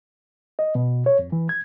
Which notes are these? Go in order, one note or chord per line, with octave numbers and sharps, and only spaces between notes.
D#5
B2
C#5
F2
E3
G#6